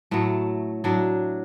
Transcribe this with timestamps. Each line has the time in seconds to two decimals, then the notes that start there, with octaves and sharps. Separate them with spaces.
0.11 A2 F#3 A3
0.84 A2 F#3 D4